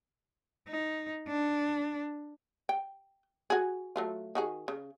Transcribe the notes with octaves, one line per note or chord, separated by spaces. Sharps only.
D#4
D4
G5
F#4 G#4
F#3 A3 F4
D#3 F#4 G#4
C#3